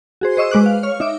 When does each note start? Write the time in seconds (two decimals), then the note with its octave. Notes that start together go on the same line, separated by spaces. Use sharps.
0.21 F#4 G#4 C5
0.37 C5 D#5 C#6 E6
0.51 G#3 B4 D6 F#6
0.66 F5
0.83 C#5 F6
1.00 D#4 E5 D6